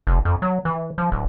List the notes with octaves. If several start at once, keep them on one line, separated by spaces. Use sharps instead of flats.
F1
F2
F#3
E3
F3
D1